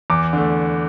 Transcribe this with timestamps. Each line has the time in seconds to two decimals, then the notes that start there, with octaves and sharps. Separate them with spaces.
0.10 E2 D6
0.33 D3 A3